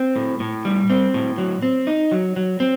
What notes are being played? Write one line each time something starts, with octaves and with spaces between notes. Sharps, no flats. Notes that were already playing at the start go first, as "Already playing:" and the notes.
Already playing: C4
A2
A2
G3
C4
A2
F#3
C4
D#4
F#3
F#3
C4